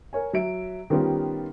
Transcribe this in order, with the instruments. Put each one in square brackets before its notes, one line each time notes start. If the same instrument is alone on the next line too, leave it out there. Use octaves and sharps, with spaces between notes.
[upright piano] A#4 C#5 G#5
F#3 E5 D7
D#3 G3 B3 C#4 F4 G4